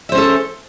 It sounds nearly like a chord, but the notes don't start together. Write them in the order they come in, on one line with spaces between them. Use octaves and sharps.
E5 C5 C#4 A4